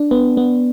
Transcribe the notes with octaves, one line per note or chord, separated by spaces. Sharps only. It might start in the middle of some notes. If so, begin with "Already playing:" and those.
Already playing: D4
B3
B3